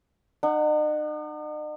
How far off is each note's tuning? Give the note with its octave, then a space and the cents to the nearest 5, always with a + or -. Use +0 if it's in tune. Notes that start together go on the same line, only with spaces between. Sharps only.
D#4 -45 F#5 +0